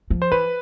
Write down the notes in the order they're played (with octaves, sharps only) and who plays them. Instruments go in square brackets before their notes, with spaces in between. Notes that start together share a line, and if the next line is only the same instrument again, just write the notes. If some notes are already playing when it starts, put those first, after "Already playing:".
[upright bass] F3
[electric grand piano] C5
[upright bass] E3 [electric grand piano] B4